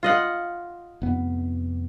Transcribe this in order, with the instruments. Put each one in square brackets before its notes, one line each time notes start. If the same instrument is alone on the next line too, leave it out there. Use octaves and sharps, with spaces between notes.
[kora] F4 D#5 F#5
[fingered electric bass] F1 B3